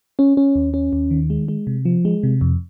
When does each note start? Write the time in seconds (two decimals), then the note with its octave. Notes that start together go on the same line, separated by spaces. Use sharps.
0.19 C#4
0.37 C#4
0.56 D#2
0.74 C#4
0.93 D#2
1.11 D#3
1.30 G#3
1.48 G#3
1.67 C3
1.85 F3
2.05 G#3
2.23 C3
2.41 F2